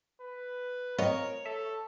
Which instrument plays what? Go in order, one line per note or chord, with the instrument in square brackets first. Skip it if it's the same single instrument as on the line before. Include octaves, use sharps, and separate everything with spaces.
[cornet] B4
[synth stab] C4 F4 D#5 [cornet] A#4 [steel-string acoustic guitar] C#5
[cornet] A4 [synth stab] E5